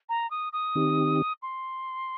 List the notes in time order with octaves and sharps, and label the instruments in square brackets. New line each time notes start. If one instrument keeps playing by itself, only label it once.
[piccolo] A#5
D#6
D#6
[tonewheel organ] D#3 C4 D#4 G4
[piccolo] C6